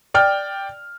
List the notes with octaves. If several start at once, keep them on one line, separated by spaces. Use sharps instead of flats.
D5 G5 F6